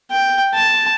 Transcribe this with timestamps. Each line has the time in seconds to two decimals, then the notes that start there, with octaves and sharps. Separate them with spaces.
0.11 G5
0.54 A5